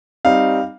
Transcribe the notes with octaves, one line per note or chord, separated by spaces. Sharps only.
G3 C4 D#4 F5